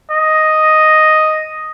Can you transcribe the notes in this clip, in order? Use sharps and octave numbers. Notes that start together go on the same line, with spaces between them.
D#5